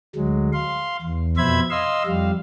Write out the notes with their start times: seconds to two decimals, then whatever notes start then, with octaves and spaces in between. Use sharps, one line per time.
0.16 D2 F#3 G#3
0.53 F5 C6
1.02 E2
1.37 F2 B2 C5 E5 B5 G#6
1.70 D#5 F5 C6 E6
2.06 F2 G3 F5